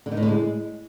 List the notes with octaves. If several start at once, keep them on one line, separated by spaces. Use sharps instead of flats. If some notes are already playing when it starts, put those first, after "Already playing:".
D3
D#3
A2
D3
G#3